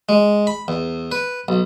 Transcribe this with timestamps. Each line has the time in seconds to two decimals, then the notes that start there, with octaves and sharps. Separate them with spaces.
0.09 G#3
0.47 B5
0.68 E2
1.12 B4
1.48 B1